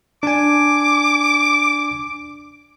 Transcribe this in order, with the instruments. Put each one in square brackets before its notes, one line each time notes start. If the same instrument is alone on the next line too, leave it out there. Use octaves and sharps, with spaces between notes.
[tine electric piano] D4 G#5 [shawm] D6